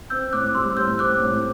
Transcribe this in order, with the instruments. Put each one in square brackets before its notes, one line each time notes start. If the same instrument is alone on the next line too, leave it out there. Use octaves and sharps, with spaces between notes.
[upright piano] C4 [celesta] E6 G6
[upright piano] A2 [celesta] D6 F#6
[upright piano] G3 [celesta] C6 E6
[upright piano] A2 [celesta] E6 G6
[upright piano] C4 [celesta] D6 F#6
[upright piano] A2